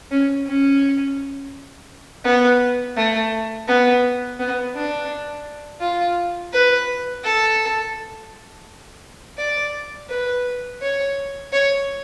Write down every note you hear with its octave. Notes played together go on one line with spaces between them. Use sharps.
C#4
C#4
B3
A3
B3
B3
D4
F4
B4
A4
D5
B4
C#5
C#5